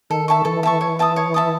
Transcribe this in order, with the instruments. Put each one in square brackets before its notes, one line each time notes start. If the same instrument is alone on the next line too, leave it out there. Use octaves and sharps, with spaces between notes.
[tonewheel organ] D#3 [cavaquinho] A4
[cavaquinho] E5 A5 C#6
[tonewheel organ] E3 [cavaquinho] A4
[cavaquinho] E5 A5 C#6
C#5
E5 A5 D#6
C#5
E5 A5 D#6